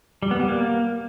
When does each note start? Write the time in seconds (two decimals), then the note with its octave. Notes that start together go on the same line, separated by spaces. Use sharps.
0.22 G3
0.31 B3
0.40 G3
0.48 A#3